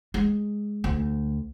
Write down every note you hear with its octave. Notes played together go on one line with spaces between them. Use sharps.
G#3
D2